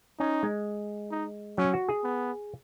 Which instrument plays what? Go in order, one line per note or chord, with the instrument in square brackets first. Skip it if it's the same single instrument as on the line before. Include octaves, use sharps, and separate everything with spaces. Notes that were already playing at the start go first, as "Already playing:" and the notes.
[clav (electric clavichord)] C#4 [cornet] D#4
[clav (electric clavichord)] G#3
[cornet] D#4
[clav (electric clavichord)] F#3 [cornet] C#4
[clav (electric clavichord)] F#4
G#4
[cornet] B3